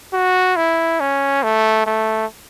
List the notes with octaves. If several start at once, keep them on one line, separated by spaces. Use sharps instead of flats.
F#4
E4
C#4
A3
A3